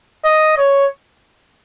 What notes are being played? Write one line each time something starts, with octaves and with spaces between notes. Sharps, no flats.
D#5
C#5